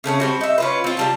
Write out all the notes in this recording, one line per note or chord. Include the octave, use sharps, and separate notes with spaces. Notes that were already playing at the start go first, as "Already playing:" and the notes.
C#3 A3 C4 C#4
G3 C4 F#4
D#4 E5
C#4 F4 B4
C4 F4
C3 G3 A5